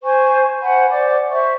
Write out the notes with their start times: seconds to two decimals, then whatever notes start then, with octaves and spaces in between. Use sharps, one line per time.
0.03 C5 G#5 C#6
0.60 C5 F#5 G#5 B5
0.89 C5 D5 D6
1.29 C5 E5 C#6